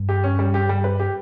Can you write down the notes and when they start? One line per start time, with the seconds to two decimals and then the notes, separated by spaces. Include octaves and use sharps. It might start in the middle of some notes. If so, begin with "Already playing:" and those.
Already playing: G2
0.09 G4
0.24 C#4
0.39 G3
0.54 G4
0.69 G3
0.84 B4
1.00 G4